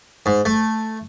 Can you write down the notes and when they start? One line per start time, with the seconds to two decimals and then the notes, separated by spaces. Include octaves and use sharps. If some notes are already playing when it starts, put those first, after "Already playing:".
0.26 G#2
0.45 A3